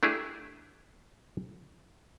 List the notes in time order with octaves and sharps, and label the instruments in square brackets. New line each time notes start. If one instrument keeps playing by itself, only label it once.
[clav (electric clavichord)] A3 D4 E4 G4 G#4